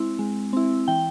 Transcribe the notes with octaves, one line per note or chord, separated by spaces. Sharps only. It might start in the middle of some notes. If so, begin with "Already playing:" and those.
Already playing: G#3 C4 E4
G#3
C4 E4
E3 G5